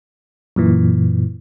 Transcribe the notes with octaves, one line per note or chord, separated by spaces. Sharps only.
F#2 A#2 E3